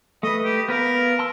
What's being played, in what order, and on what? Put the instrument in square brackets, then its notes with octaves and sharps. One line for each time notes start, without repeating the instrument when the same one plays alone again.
[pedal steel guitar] A3 B4 [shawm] D#5
[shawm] G4
[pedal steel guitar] B3 B4 F5 [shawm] A#4
[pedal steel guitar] A5 C6 E6